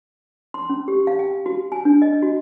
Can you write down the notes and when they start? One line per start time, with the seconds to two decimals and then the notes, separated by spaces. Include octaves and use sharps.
0.54 C6
0.69 C#4
0.88 G4
1.07 F5
1.19 G5
1.46 F#4
1.72 G#5
1.85 D4
2.02 D#5
2.22 F#4